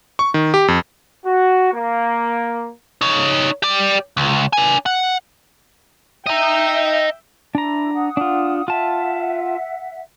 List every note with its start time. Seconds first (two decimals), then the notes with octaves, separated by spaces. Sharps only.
0.19 C#6
0.34 D#3
0.54 G4
0.68 F2
1.26 F#4
1.73 A#3
3.01 D#4 C#5
3.63 G4 D5
4.17 C#2
4.53 D4 G#5
4.86 F#5
6.27 D#5 E5 G5 A#5
7.55 D4 E4 A#5
7.94 F#5 D#6
8.17 D4 F4
8.68 F4 E5 F#5 A5